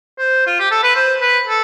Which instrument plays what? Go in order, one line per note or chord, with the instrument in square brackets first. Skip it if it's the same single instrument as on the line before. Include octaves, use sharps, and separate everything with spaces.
[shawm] C5
F4
G4
A4
B4
C5
B4
A4